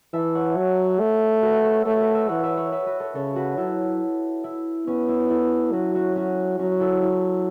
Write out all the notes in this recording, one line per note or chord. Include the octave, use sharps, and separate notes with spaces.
E3 E5 A5
C#5 F#5
F#3
A3
F#4 B4
E5
A4 C#5
A3 A4 C#5
F#4 B4
B4 E5
E3 C#5 F#5
B4 E5
C#5 F#5
B4 E5
F#4 B4
A4 C#5
C#3 A4 C#5
F#4 B4
F#3 E4 A4
E4
B3 C#4
E4
E4 A4
F#3 C#4 F#4
C#4 F#4
C#4 F#4
F#3 C#4 F#4
E4 A4
E4